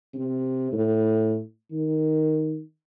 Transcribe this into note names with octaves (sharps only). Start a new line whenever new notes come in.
C3
A2
D#3